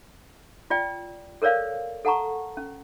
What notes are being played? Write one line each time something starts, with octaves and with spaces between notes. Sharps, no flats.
F4 D5 G5
A4 A#4 C#5 D5 F5
A4 F#5 A5 A#5 C#6
C#4